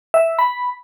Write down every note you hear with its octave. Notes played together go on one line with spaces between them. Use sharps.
E5
B5